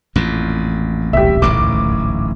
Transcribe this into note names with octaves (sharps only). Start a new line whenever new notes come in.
A1 F2 A#2
D#1 B1 G4 E5
D1 A1 G#2 D6